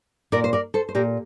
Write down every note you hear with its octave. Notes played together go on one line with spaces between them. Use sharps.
A#2 A#4 D5
C5
A#4 D5
A4 C5
C5
A#2 G4 A#4